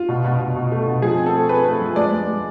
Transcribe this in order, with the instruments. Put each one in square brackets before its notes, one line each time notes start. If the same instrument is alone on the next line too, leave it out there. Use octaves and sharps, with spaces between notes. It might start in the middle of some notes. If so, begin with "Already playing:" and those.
Already playing: [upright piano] F4
B2
B2
B2
B2
A3
B2
F3 G#4
C4
A4
A3
A3 B4
A3
F3
G#3 D5
G#3
G#3